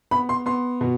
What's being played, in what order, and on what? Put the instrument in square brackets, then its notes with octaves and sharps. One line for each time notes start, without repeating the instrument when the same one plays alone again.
[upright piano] B3 B5
C6
B3 C6
B2